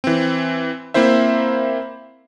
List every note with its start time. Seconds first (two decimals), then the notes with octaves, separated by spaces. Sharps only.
0.04 E3 C4
0.94 A#3 C4 E4 C5 E5